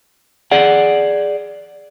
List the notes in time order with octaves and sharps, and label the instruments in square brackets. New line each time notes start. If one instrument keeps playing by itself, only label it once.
[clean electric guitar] G#4 D5 F#5